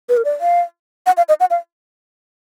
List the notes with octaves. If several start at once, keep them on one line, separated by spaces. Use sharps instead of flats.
B4
A#4
D5
F5
F#5
F5
D#5
F#5
F5